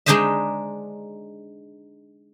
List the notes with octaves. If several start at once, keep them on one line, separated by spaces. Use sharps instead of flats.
G#3 D4 D#4 C5 D#5 E5